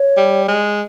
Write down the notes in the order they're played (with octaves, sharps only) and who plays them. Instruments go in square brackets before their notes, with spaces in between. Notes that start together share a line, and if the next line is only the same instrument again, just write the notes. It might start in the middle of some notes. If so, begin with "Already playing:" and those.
Already playing: [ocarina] C#5
[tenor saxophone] G3
G#3